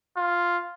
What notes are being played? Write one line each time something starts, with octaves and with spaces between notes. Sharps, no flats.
F4